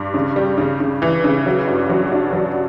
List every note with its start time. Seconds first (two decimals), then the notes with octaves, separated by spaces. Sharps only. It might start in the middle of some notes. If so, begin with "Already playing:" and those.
Already playing: G2
0.14 C#3
0.36 G3
0.58 C#3
0.80 C#3
1.02 E3
1.24 C#3
1.46 F#3
1.67 G2
1.90 F#3
2.12 D4
2.33 F#3